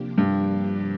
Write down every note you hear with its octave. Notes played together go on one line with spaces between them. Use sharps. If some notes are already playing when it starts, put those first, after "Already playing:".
Already playing: C3 F3 A#3 D4 G4
G2